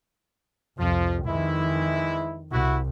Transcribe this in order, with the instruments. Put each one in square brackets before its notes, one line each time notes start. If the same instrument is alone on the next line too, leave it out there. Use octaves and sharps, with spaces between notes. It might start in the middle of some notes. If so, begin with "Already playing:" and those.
[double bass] C2 F2 [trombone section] F3
[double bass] F2 D#3 [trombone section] E3 G#3 E4
[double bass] C2 [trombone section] E4 F#4